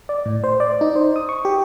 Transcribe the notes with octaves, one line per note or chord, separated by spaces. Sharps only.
D5
A2
C5
D5
D#4
C5
D#6
C#6
G4